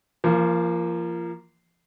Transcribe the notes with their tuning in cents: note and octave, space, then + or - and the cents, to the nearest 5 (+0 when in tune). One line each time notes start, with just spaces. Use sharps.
F3 -30 A#3 +0